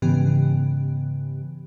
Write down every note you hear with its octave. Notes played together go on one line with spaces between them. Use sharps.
G#2 C#3 E3 B3 C#4 G4